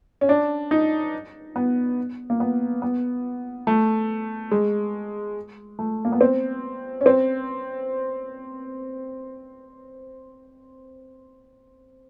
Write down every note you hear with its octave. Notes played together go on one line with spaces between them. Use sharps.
C#4
D4
D#4
B3
A#3
B3
B3
A3
G#3
A3
A#3
B3
C4
C#4
C4